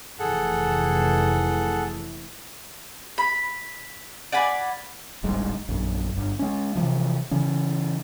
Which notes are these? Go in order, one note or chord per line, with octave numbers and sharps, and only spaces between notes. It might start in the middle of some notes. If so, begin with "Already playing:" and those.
F1 E3 G#4 A4 F#5
B5
D5 F#5 G#5 B5
D1 G#1 G#2 G3
A#1 F#2
G1
G#3 C#4
C3 E3 F3
C#3 E3 C#4